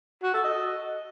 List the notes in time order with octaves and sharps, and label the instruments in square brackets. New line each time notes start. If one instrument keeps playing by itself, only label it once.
[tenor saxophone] F#4
A4
D#5